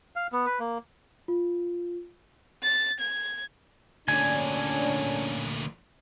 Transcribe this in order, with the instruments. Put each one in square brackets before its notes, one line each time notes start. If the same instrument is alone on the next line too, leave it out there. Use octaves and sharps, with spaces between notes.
[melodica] F5
B3
B4
A#3
[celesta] F4
[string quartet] A6
G#6
[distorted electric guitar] D2 A#2 [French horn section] D3 C#4 D4 [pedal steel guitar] G#5